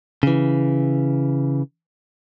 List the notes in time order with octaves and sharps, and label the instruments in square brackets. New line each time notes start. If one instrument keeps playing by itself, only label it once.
[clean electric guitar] C#3 E3